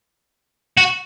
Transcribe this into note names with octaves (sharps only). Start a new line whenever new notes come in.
F#4